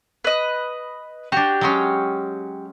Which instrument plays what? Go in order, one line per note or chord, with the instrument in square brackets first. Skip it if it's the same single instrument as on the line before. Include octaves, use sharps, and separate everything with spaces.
[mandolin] B4 D#5
[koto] D4 F#4 [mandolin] G4
[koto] F#3 G#3 C#4